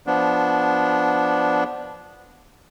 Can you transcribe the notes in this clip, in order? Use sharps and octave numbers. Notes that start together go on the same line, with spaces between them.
F3 B3 D4